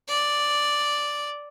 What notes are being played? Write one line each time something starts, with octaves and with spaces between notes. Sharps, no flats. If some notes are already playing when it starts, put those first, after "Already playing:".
D5